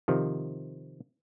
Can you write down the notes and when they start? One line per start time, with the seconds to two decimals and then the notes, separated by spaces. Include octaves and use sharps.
0.08 C3 D#3 F3